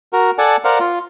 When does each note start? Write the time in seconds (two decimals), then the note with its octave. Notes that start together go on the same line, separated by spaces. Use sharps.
0.13 F#4 A#4
0.38 A4 D5 F#5 G#5 A5
0.64 A#4 C5 D5 F5 F#5
0.79 F4